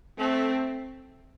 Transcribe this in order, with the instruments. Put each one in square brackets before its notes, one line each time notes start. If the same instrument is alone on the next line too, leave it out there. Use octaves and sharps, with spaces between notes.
[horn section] A3 [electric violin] C4